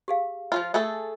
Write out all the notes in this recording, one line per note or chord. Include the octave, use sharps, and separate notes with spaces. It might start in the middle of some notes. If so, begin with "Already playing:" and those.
G4 G#4 F5
F3 F#3 F4
A3 G#4 A4 E6